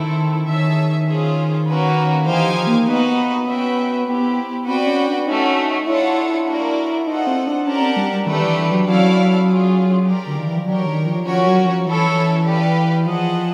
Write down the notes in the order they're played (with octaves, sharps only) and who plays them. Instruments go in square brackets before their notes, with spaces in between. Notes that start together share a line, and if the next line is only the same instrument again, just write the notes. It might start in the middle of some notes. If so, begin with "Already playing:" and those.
Already playing: [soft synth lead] D#3 [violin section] A3 C4 E4 A4
[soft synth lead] D#3 [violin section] G#4 C#5 E5 A5
[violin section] C#4 F4 G#4 C5
A#3 C#4 F#4 B4
[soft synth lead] E3 [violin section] D#4 G4 C5 F5 G#5
[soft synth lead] F3
A#3
[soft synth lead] B3 [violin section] D#4 F#4 B4 D#5
[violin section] C#4 F#4 B4 E5 G5
[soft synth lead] B3 [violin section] C4 E4 G4
[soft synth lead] C4 [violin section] F#4 B4 D5 G5
[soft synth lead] C#4
D4
[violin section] A3 C#4 F#4 [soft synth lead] D#4
[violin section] D4 F4 A4 C#5 F#5 [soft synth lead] E4
[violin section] A#3 D4 F#4 A#4 D5
[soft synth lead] D#4 [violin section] F4 A4 C5 D#5 F#5
[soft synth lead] C4
D4
[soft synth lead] C#4 [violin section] G4 A#4 D5 F#5 A5
[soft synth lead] C4
G3
G3
[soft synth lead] D#3 [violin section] A3 D4 G4 B4
[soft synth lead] E3
E3
F#3
[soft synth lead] F#3 [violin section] C#4 E4 A4 D5 F5
[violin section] C#4 F4 G#4
G4 A#4 D5 F5
[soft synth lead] D3
D#3
E3
F3
[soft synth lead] F#3 [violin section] D4 G4 A#4 C#5
[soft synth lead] D#3
F3
[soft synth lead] F3 [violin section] C#4 F#4 A#4 C#5
[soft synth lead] F#3
F3
[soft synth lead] E3 [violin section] C#4 E4 A4 C#5
[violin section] G4 B4 D5 F5
[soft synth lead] F3 [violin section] G#4 C5 D#5 F#5 A5